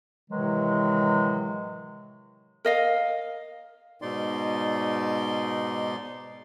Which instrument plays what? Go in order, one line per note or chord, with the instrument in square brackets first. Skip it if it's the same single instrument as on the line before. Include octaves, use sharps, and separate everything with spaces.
[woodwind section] A2 C3 D#3 E3 F#3 G#3
[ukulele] A#4 D#5 F5
[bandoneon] G#2 B2 D#4 D5 C6